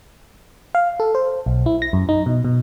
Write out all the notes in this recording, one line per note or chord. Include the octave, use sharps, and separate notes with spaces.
F5
A4
C5
B1
E4
A#6
F#2
D#4
B2
B2